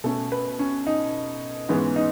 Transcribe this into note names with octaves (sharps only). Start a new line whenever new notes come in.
B2 A3 C#4 A4
B4
C#4
D#4
G#2 E3 G#3 B3 C#4
D#4